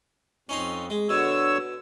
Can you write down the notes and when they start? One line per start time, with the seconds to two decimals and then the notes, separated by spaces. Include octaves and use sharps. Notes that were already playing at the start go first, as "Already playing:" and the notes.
0.49 F2 C#4 D#4 C6
0.90 G#3
1.09 B2 D3 C#5 E6